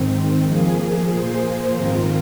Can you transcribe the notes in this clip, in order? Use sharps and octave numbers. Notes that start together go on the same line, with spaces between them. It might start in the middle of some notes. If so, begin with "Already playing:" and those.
Already playing: G#2 D#3 C4
F3 A#3 G#4
A#2 F3 A#3 G#4 C5
G#2 D#3 C4 F4 A#4